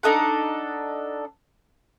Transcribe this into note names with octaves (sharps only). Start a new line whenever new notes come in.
D4 D#4 A4 F#5